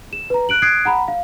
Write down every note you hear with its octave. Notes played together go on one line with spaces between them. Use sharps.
E7
B4 A#5
F#6 D7 F#7
D#6 F#6 G#6 C7 D7
F#5 A#5 B5
F5